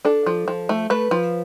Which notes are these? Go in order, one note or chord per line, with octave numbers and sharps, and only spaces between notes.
D4 A4
F3
F3
A3
A3 B4
F3